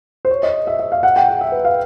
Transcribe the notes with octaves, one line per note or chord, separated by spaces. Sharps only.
C5
C#5
D#5
E5
E5
F5
F#5
G5
F#5
E5
B4
F5